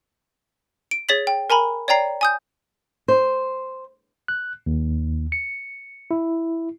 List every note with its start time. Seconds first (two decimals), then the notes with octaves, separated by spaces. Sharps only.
0.91 D7
1.09 G#4 C#5 A6 B6 F#7
1.27 G5
1.50 A#4 G#5 A#5 B5
1.88 C#5 D5 G5 A#5 C7
2.21 G#5 D#6 G6
3.08 C5
4.28 F#6
4.66 D#2
5.32 C#7
6.11 E4